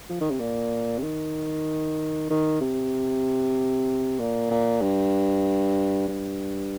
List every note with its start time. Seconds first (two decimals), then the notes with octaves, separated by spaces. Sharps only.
0.09 F3
0.21 D#3
0.31 C3
0.40 A#2
0.99 C3
1.03 D#3
2.30 D#3
2.61 C3
4.20 A#2
4.51 A#2
4.82 G2
6.08 G2